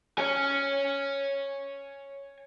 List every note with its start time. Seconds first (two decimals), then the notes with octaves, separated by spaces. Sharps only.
0.18 C#5 G#5